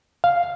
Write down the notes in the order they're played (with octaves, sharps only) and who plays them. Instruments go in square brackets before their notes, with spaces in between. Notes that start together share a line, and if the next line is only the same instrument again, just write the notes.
[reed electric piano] F5